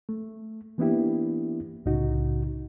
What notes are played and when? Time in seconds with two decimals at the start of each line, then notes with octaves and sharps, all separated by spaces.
0.09 A3
0.78 E3 A#3 B3 D4 E4 G4
1.86 C2 A2 C#3 D#4 F#4